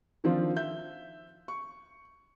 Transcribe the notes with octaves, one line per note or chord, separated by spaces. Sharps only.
D#3 F3 C4 D4 F4
E5 G6
C#6